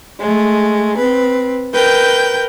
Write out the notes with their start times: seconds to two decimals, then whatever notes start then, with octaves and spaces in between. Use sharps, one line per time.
0.20 G#3 A3
0.98 C4 B4
1.73 A#4 B4 G5 G6